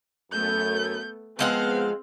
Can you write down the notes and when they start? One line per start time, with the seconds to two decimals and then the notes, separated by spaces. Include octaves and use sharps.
0.32 F#2 A3 B3 G6
1.39 F3 G#3 B3 C4 F5 F#5